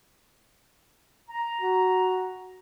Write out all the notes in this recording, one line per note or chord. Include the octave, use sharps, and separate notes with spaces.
A#5
F#4